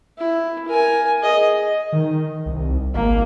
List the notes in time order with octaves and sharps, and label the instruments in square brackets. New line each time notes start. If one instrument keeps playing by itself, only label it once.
[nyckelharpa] E4
A#4 G#5
G#4 D#5
[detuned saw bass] D#3
C2
[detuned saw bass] G#1 [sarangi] A#3